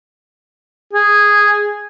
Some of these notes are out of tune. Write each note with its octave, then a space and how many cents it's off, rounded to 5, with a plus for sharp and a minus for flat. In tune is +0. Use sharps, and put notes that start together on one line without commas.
G#4 -5